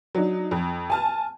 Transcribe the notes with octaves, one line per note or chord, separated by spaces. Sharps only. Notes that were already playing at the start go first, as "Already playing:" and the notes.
F#3 D4 D#4
F2
G#5 A5 F6